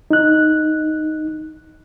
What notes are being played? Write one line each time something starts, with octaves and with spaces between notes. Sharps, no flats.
D#4 F#6